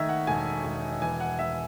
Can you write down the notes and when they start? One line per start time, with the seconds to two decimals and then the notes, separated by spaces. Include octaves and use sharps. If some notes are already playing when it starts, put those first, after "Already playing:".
Already playing: D#3 A3 C#5 D#5 E5
0.09 F#5
0.27 E1 G#5
0.64 E1
1.01 E3 G#5
1.20 F#5
1.39 E3 E5